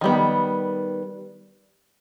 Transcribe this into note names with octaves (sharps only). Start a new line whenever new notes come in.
D#3 G3 B3